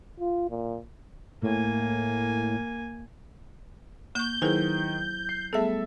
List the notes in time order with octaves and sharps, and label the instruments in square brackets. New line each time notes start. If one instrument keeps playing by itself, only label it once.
[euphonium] F4
A#2
[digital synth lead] A2 [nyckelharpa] A#3 G#5
[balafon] A#3 C#6 [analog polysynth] G6
[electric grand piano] D#3 [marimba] F#3 E4 C5 [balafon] G#4 B4 G#5
[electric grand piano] C7
[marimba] G3 A3 B3 [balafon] G#4 A5 [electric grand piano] A4 E5